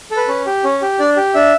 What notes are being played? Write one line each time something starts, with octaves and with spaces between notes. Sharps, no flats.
A4
B4
C#4
G4
C#4
G4
D4 D5
G4
D4 E5